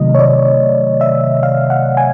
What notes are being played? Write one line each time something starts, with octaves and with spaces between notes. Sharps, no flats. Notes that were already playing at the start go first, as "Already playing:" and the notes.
Already playing: C3 D#3 F#3 A3 D#5
C#5
D5
E5
F5
F#5
G#5